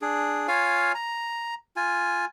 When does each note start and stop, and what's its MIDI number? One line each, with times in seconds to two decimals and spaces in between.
0.02 0.47 62
0.02 0.47 68
0.48 0.92 65
0.48 0.92 73
0.48 0.92 77
0.48 0.92 80
0.95 1.54 82
1.76 2.25 65
1.76 2.25 80